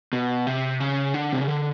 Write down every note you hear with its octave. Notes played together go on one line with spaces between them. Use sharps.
B2
C3
C#3
D3
C3
C#3
D3